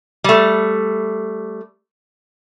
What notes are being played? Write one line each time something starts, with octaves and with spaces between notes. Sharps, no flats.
G3 A3